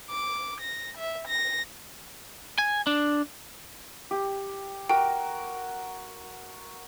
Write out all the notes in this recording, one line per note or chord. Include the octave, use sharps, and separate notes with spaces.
D6
A#6
E5
A#6
G#5
D4
G4
F#4 A#4 G5